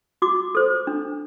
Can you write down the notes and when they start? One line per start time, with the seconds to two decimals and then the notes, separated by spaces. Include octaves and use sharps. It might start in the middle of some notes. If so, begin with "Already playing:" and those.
0.22 F#4 D6
0.55 A4 C5
0.87 D4